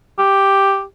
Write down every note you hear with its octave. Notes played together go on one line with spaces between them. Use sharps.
G4